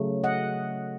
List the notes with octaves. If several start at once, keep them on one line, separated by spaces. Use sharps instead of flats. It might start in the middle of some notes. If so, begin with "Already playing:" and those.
Already playing: C#3 F#3 A3
D#5 F#5